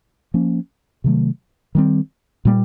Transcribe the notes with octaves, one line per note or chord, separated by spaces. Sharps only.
F3 A#3 C#4
C3 D#3 F#3 A3
D#3 G3 C4
A#2 G3 A#3